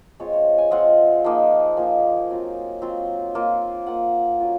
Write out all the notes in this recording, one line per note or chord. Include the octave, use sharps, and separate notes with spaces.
G#3 C4 F4 C#5
C#5
G#5
G#3 C4 F4 F#5
F3 A#3 D#4
F3 A#3 D#4 G#5
F#3 C4 F4
F#3 C4 F4
A#3 F4
A#3 F4 F#5
F#3 C#4 F4